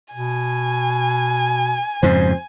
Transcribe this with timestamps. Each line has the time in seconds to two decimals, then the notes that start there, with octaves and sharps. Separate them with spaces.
0.13 B2 G#5
2.03 F2 G#2 C#3 C5